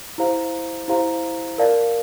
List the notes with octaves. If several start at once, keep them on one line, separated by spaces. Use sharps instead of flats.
E4 G4 C5 F5 A#5
E4 G4 C5 F5 A#5
A#4 D5 F5 A5